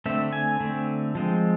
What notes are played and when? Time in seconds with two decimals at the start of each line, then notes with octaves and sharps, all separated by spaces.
0.06 D3 A3 C4 E5
0.33 G#5
0.60 D3 A3 C4
1.15 F3 G#3 C4